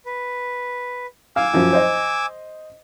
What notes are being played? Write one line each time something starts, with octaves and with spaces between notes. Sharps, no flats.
B4
F5 G#5 D6 E6
F#2 F3
C5 D#5